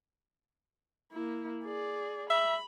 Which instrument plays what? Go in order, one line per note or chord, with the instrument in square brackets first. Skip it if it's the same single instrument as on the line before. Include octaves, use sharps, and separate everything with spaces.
[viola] A#3 E4
G#4 D5
[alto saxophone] E5 [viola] B5